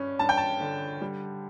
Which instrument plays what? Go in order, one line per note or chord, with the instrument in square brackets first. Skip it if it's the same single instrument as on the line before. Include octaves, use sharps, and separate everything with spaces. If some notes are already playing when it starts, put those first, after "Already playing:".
Already playing: [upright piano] G2 C#4
G2 A5
G5
A5
D3
G3